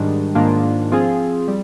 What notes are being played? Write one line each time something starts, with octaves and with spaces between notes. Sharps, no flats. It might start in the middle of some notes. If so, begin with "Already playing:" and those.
Already playing: G#2 D#3 G3 D4
G#2 D#3 A#3 D4 F4
F3 C4 F4 G#4
G3